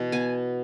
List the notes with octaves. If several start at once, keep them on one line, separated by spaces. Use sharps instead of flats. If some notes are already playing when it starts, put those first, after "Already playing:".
Already playing: B2 E3
B3 G#5